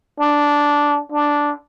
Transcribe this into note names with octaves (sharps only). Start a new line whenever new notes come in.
D4
D4